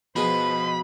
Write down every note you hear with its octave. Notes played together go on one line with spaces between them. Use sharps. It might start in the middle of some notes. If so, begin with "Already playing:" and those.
B2 F3 G#3 B3 G#4 B4 C5 B5